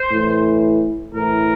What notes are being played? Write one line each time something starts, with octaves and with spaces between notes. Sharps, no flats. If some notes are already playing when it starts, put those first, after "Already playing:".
Already playing: C5
A2 E3
A2 E3 A#4